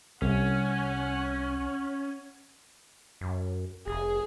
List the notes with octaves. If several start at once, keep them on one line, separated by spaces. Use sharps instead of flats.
C2 C#4 F#5
F#2
F1 G#4